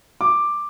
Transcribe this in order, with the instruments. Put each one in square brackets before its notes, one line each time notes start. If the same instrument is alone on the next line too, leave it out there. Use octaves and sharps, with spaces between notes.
[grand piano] D6